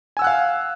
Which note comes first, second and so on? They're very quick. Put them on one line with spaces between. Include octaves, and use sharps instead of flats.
G#5 E6 F#5 F#6 F5